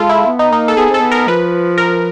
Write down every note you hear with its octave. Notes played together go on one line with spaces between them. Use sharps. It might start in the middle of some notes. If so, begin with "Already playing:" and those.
Already playing: G#3 F4 A4
E4
B3
D#4
A#3 D#4
A4
B3 G#4
C4
A4
B3
A#4
F3 B4
A#4